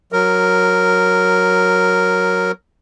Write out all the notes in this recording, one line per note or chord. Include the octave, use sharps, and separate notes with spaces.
F#3 A#4